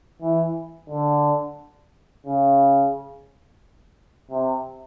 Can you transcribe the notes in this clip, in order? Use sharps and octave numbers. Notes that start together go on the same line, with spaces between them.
E3
D3
C#3
C3